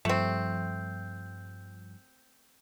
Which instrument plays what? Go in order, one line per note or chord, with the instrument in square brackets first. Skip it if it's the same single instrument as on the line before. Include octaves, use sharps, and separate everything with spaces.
[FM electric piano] G2 F3 G3 [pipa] A3 C4